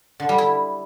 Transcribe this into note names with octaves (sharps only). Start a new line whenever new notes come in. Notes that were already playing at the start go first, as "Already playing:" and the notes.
D3
G3
E4